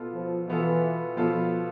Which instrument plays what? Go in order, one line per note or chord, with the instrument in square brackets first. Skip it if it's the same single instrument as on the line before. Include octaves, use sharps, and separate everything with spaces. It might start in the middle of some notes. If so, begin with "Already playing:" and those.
Already playing: [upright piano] B2 B3 F4 A4
[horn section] F3
[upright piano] B2 B3 F4 A4 [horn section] E3
[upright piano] B2 B3 F4 A4 [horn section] F3